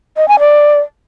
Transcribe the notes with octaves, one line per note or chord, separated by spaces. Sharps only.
D#5
G#5
D5